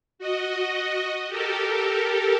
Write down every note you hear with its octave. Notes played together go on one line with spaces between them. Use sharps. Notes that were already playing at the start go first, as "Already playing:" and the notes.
F#4 D#5
G4 A4 A#4